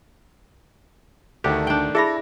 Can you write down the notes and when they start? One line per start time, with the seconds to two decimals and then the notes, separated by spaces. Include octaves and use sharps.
1.44 D2 D#3 A3 D4 G4
1.67 D4 G5
1.95 E4 G#4 A4 E5 B5 A#6